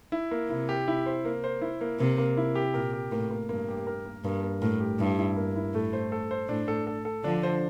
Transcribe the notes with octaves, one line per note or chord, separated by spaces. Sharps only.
E4
A#3
C3 E4
G4
E4
C5
A#3
C5
E4
A#3
C3 A#3
A#3
E4
G4
A#2 A#4
G4
A2 A#3
A#3
G2 A#3
G4
A#4
A#3
G2 A#3
A#3
A2 A#4
G4
G2 E4
E4
A#3
E4
A2 A3
C5
A4
C5
A2 D4
A4
A4
A4
D3 F3 D4
C5